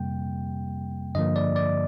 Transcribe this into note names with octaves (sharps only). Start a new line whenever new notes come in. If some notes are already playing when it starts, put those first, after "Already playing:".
Already playing: F2 C3 G3 A#3 G5
G2 D3 F3 A#3 D#5
D5
D5